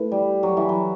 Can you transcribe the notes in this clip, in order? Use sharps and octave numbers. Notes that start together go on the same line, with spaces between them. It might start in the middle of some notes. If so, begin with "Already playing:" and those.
Already playing: A3 E4 B4
G3
F#3
E3
F#3